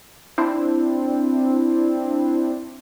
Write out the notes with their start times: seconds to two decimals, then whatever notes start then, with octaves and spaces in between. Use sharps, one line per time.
0.38 C4 D4 E4